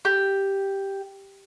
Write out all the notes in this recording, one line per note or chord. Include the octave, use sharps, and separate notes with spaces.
G4